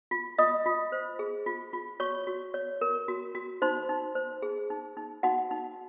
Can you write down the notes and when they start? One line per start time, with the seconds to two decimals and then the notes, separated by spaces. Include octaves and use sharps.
0.11 F4
0.39 F4 D#5 D#6
0.66 F4
0.92 C5
1.19 G#4
1.46 F4
1.73 F4
2.00 F#4 C#5 C#6
2.27 F#4
2.54 C#5
2.81 A#4
3.08 F#4
3.35 F#4
3.62 D#4 C5 C6
3.89 D#4
4.15 C5
4.42 G#4
4.70 D#4
4.97 D#4
5.23 D#4 F#4 F#5
5.51 D#4